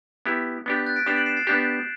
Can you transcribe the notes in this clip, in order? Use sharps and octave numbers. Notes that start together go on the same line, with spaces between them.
B3 E4 G4
B3 D4 G4
G6
F#6 A6
B6 D7
B3 D4 G4 C7 E7
D7 F#7
C7 E7
A6 C7
B3 D4 G4 G6 B6